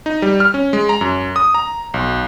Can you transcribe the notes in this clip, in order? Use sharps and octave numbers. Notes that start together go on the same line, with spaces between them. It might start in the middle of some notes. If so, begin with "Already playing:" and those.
D#4
G3
F6
C#4
G#3
A#5
F#2
D#6
A#5
B1